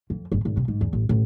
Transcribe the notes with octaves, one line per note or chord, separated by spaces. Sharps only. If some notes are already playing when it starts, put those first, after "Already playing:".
F2
G1
G#1
C3
G#2
E2
A1
A1